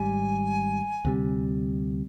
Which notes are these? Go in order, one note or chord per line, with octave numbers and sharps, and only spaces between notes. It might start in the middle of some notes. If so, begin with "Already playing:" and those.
Already playing: G#1 G#2 G3 G#5
D2 C3 G3